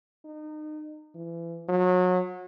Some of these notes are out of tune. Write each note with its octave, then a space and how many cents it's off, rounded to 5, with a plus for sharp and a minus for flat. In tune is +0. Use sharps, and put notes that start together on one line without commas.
D#4 -30
E3 +30
F#3 -30